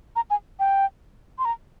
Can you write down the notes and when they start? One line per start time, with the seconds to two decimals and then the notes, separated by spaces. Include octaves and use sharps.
0.16 A#5
0.30 G#5
0.60 G5
1.39 C6
1.45 A#5